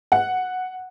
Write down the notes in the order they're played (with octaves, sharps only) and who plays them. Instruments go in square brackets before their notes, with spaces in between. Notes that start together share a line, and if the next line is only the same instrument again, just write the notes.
[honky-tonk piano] F#5